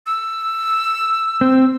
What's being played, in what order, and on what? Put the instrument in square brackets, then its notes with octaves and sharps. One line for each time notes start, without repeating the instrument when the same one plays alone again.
[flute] E6
[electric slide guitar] C4